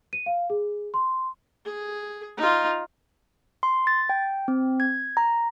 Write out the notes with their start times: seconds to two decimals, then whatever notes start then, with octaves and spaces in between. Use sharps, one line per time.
0.13 D#7
0.26 F5
0.50 G#4
0.94 C6
1.66 G#4
2.37 D#4 F4
3.63 C6
3.87 A6
4.09 G5
4.48 C4
4.80 G#6
5.17 A#5